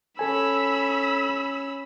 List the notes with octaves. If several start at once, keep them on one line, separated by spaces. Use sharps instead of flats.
C#4 A4 G#5 B5 E6